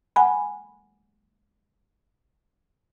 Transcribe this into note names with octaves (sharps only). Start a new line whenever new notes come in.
F#5 G#5 B5